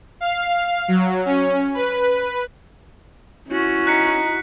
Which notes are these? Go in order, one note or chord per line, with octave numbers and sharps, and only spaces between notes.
F5
F#3
C#4
B4
C#4 E4 F#4
D#4 F#6 B6 C#7